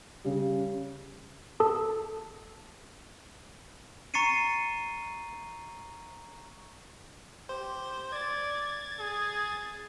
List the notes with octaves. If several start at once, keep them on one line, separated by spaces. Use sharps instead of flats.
C#3 G3
A4 A5 D#6
A#5 C#6 A6 C7 C#7 D#7
G4 C5
D5 G#6 A6
G#4